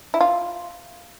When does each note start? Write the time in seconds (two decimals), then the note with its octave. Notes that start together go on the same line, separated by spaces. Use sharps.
0.14 E4
0.21 F4